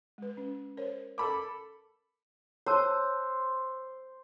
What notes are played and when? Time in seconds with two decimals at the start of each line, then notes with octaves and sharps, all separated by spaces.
0.18 G#3 B4
0.37 C#4
0.77 A#4 C5 C#5
1.18 A4 A#4 B5 D6
2.66 C5 C#5 A5 D6 E6 F#6